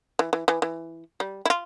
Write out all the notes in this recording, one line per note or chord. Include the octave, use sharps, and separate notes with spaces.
E3
E3
E3
E3
G3
E4
F4